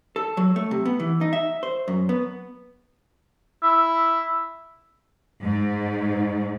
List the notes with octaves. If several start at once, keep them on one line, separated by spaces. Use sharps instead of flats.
A4
F#3
A3
C3
B3
E3
D#4
E5
C5
F#2
B3
E4
G#2